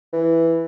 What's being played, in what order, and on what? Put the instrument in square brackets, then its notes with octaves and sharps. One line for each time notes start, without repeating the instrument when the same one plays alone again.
[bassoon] E3